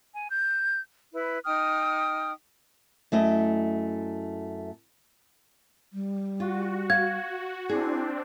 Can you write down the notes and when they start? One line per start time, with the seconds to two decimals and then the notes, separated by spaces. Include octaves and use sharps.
0.13 G#5
0.29 G6
1.13 E4 B4
1.45 D#4 G5 D#6 F6
3.12 F#2 A3 E4 D#5
5.93 G3
6.40 F4 F#4
6.90 F5 G#6
7.69 C4 D4 E4 G#4